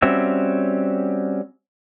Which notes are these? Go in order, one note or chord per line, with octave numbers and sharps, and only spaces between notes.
G3 C4 C#4 F#4 E5